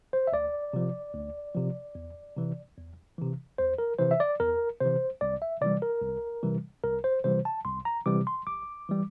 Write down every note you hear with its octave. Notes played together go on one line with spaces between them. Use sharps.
C5
E5
D2 D5
C3 F3
D2
C3 F3
E2
C3 E3
E2
C3 E3
E2 C5
A#4
C3 E3 C5
E5
D5
E2 A#4
C3 E3 C5
C2 D5
E5
C3 E3 G3 D5
A#4
C2
C3 E3 G3
C2 A#4
C5
C3 E3 G3 C5
A5
C2 C6
A#5
C3 E3 G3 D6
C6
A1 D6
E3 G3